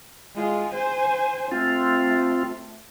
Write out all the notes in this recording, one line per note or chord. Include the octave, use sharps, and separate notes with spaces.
G#3 F4
C5 G#5
A3 C4 F4